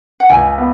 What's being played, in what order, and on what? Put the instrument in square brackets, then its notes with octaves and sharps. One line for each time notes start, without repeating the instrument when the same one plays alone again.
[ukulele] F#5
[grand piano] C#2 [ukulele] G#5
[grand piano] B3